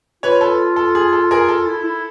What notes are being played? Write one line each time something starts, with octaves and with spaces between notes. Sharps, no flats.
F4 B4 C#5
A4 B4
A4
G#4
A4
G#4 A#4
A4
E4
E4